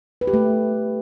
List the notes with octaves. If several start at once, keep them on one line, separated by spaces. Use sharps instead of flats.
B4
G4
A3